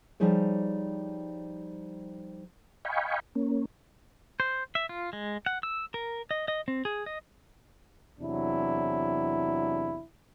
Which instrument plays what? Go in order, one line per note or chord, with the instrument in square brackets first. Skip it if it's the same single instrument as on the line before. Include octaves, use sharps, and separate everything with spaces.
[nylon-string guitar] F3 G3 D#4 G#4 C5 C#5
[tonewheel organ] D#5 F5 G5 G#5 B5 C#6
A#3 C#4
[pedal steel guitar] C5
E5
F4
G#3
F#5
E6
A#4
D#5
D#5
C4
G#4
D#5
[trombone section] E2 C3 F#3 D4 E4